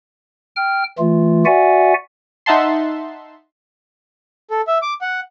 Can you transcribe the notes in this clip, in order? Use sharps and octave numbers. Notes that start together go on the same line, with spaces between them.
G5 F6
E3 A3 F4
F#4 D5 E5 F#5 G#5
D#4 E5 F#5 A5 C6
A4
E5
D6
F#5